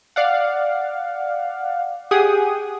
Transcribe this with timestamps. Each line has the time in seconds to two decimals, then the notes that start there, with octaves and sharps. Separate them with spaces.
0.16 D5 F5 F#5
2.11 G4 G#4 F#5 G5 D#6